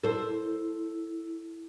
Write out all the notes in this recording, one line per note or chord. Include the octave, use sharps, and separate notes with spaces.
E4 A4 C5